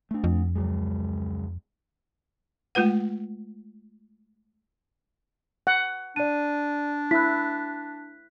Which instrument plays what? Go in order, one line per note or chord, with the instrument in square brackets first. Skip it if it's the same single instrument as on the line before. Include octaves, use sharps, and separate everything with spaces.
[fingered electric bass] A3 D4
[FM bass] F2
[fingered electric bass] C#2 F#3 G#3
[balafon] G#3 A3 F4 B4 F#5
[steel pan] F#5
[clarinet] D4 [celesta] D5 D#7
[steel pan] E4 [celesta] F#6 B6